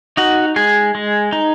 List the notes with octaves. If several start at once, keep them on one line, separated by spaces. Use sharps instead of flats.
D#4 F#4
G#3 G#4
G#3
D#4